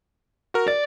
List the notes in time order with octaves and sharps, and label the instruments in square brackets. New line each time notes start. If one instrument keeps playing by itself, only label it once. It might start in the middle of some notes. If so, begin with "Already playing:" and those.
[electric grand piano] F#4 A#4
[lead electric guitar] D5 [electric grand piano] A6